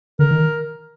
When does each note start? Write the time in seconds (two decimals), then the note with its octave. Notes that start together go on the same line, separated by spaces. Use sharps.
0.19 D3 A#4
0.31 D#3